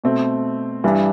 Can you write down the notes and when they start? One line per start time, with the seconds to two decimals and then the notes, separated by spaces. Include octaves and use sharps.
0.04 B2 A3 C4
0.84 G2 E3 G3 D4